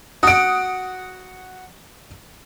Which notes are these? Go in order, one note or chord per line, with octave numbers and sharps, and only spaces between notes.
F#4 F#5 D#6 D7